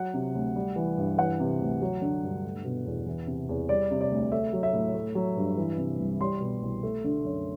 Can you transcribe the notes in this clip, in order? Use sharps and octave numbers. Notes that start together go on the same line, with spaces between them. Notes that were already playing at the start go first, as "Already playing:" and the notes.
Already playing: F#3 F#5
C3
D2
G3
E3
G2
E3 F#5
C3
D2
F#3
D3
G2
A3
B2
E2
E3
C3
E2
G3 D5
C3
D5
D2
A3 E5
F#3
E5
A2
A3
F#3
G2
E3
C3
C2
G3 C6
B2
C2
A3
D3
F#2